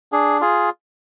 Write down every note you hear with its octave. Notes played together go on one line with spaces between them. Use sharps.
D4 G#4
F4 G#4